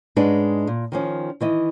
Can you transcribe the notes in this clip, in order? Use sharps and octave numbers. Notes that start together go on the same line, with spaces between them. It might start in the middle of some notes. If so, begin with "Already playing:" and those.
G#2 G#3 C#4 D4 B4
A#2
D#3 F3 C#4
D#3 E3 D#5